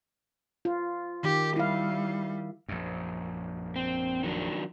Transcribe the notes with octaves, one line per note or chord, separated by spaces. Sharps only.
F4
D#3 G4
G3 E4 F5
A#1 F#2
C4
D#3 F#3 D4